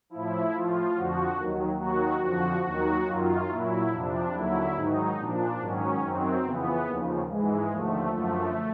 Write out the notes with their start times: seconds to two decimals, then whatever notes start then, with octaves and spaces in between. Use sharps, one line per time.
0.10 A2 F3 E4
0.52 A2 F3 F4
0.94 F2 D3 F3 F#4
1.37 D#2 D#3 F#3
1.79 D#2 D#3 F#3 F#4
2.22 F2 D3 F3 F#4
2.63 D#2 D#3 F#3 F#4
3.06 F#2 D#3 F#3 F4
3.48 A#2 F#3 E4
3.90 F2 C3 F3 D4
4.33 D#2 D3 F#3 E4
4.75 G#2 D#3 F#3 D#4
5.17 A#2 F3 D4
5.60 G#2 D#3 F#3 C#4
6.02 F#2 D#3 F#3 C4
6.45 F2 C#3 E3 B3
6.87 D#2 C#3 F3
7.29 G#2 E3 G#3
7.71 D#2 D3 F3 A3
8.13 F#2 D3 F3 A3